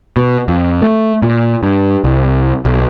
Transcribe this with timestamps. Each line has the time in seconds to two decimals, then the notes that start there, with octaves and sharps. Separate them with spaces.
0.17 B2
0.48 F2
0.82 A3
1.22 A#2
1.63 G2
2.04 C2
2.65 B1